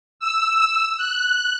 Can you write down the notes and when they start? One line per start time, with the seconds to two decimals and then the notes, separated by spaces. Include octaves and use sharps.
0.20 E6
0.97 F#6